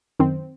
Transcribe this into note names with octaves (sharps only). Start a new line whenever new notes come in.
F#2 D#3 C4